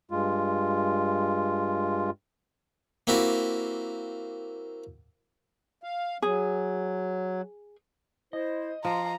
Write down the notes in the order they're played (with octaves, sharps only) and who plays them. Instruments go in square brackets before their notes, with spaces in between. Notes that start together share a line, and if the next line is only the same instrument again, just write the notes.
[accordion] G2 G#3 F4
[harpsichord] A#3 C4 E4 F#4 G4
[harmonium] F5
[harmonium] F#3 [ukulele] G#4
[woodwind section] E4 C5 [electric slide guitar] D#5
[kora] F3 [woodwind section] F5 C6 [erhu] A#5